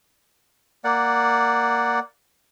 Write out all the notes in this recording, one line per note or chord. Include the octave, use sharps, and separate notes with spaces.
A#3 D5 F#5